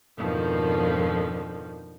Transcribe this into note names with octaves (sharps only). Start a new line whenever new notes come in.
F2 G#2 B2 D3 D#3 F3